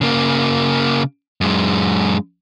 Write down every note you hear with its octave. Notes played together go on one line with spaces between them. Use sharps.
C#3 A#3
F#2 G#3